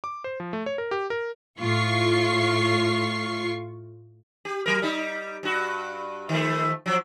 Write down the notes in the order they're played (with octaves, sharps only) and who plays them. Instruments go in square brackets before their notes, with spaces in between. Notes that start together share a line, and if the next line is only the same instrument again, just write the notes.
[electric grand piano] D6
C5
F3
A3
C#5
A#4
G4
A#4
[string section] A2 F4 C#6 C7
[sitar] G4
F#3 A#4
G3 D#4
G2 F#4
D#3 F3 A3
F3 F#3